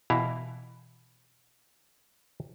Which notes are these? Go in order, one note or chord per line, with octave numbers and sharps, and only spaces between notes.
B2 E3 E4 F5 A#5